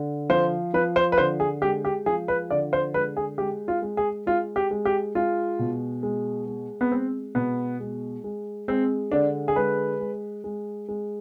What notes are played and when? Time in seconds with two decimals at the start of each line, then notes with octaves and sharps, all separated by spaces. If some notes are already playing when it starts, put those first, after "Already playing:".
Already playing: D3
0.30 F3 C5
0.74 F3 B4
0.96 C5
1.12 B4
1.18 D3 C5
1.40 G#4
1.62 G#3 G4
1.85 G4
2.06 F3 G#4
2.28 B4
2.51 D3 D5
2.73 C5
2.94 G#3 B4
3.17 G#4
3.38 G#3 G4
3.68 F4
3.82 G#3
3.97 G#4
4.26 G#3 F4
4.56 G4
4.71 G#3
4.85 G4
5.15 G#3 F4
5.59 B2
6.03 G#3
6.47 G#3
6.81 B3
6.91 G#3 C4
7.35 B2 B3
7.80 G#3
8.24 G#3
8.68 G#3 C4
9.12 D3 D4
9.48 G#4
9.56 G#3 B4
10.00 G#3
10.44 G#3
10.88 G#3